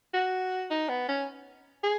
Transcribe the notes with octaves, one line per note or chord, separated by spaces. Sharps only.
F#4
D#4
B3
C#4
G#4